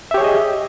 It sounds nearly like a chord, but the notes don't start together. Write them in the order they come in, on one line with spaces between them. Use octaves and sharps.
E5 G4 C#5 G#4 D#5